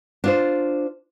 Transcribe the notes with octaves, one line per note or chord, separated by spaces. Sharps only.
D4 F4 C5